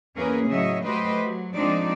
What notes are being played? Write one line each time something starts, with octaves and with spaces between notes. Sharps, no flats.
E2 A#3 C#4 G#4 A#4 B4
A2 C#3 F#3 C#5 D#5 E5
F#3 A3 G4 B4 C5 D#5
F#3
F3 G#3 C4 D4 D#4 D5